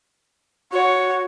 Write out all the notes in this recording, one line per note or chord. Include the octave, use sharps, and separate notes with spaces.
F#4 C#5 F#5